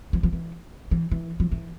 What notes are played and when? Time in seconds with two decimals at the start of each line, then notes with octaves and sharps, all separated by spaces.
0.13 F3
0.23 F3
0.33 E3
0.91 E3
1.11 E3
1.40 F3
1.52 E3